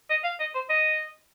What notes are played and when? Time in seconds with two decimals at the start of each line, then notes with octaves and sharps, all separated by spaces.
0.10 D#5
0.24 F5
0.40 D#5
0.55 C5
0.69 D#5